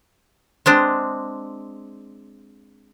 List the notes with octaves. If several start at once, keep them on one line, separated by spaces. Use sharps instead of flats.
G#3 C4 D4